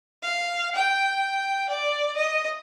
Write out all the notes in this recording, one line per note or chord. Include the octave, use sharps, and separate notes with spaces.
F5
G5
D5
D#5